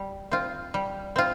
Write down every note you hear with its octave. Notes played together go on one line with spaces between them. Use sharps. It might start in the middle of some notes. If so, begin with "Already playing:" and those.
Already playing: G3
C4 F4
G3
C4 F4